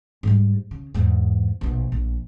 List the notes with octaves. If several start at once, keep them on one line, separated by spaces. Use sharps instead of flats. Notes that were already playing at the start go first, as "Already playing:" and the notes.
G#2 G3
C#3
E2 G#2
A#1 B2
A#1